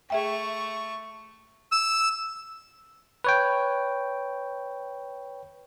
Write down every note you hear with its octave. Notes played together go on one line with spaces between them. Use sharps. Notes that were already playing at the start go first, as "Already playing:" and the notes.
A3 G#4 E5 G5 C#6
E6
B4 C#5 G5